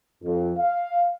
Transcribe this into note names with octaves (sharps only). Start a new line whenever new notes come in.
F2
F5